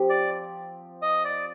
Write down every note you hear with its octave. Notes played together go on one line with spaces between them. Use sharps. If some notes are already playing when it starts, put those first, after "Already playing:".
Already playing: F3 C4 G4
D5
D#5
D5